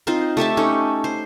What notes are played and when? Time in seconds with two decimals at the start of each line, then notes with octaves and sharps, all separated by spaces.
0.07 C4 D#4 F4 C5
0.37 A3 G4 E5 A5
0.57 C#4 D#4 A4
1.04 C5